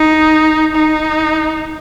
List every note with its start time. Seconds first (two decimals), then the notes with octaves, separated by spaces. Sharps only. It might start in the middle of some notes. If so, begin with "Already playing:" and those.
Already playing: D#4
0.75 D#4